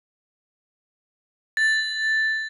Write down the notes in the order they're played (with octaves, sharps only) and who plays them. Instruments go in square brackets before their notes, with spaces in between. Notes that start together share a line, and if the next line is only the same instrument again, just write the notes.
[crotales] A6